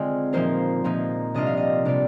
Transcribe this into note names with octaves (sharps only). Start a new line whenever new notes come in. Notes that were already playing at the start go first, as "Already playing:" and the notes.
Already playing: D3 G#3 C4 F4 G#4
A#2 F3 A#3 D#4 C5
A#2 F3 A#3 D#4
C3 G3 D4 F4 D#5
F5
D#5
C3 G3 D4 F4 D5